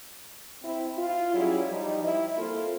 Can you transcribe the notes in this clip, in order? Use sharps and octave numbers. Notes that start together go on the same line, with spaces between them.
C4 E4
F4
F#3 G3 C#4 E4 F4 G#4
F3 G3 D#4
E4
A#3 C4 E4 F4 A4